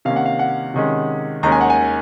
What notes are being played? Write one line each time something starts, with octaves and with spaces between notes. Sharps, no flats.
C3 D#3 A#3 C#4 F5
F#5
F5
F#5
C3 D#3 G#3 C#4
D#2 D#3 G#3 C#4 A#5
G#5
F#5
G#5